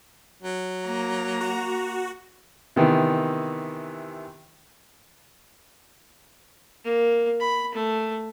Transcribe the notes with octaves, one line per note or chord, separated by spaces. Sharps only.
F#3
A#3 A#5
F#4
C3 D#3 E3 B3
A#3
B5
A3